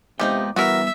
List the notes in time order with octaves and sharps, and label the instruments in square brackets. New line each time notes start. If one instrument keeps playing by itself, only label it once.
[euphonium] C3 [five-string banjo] F3 D#4 G4 [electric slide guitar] G#3 B3 G5
[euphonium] E3 [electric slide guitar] G3 B3 [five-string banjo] F#4 A#4 [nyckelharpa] E5